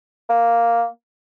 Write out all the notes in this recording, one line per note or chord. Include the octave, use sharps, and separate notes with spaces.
A#3